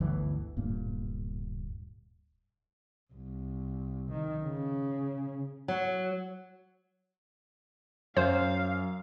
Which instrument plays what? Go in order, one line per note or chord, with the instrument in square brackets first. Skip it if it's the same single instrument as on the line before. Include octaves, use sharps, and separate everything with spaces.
[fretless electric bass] G1 D2 E3
D1 G2 A#2 A#3
[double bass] C2
D#3
C#3
[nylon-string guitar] F#3
[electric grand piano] F#2 [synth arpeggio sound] C5 [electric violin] F5